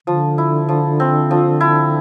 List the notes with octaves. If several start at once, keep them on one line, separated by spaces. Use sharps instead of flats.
D3 F3
E4
F3
C4
F3
E4